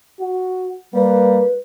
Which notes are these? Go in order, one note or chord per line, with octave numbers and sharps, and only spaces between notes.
F#4
G3 A#3 B4